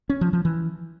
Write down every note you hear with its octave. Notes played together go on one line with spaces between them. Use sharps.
C#4
F3
F3
E3